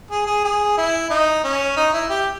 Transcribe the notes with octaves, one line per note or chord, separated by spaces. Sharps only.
G#4
G#4
G#4
E4
D#4
C#4
D#4
E4
G4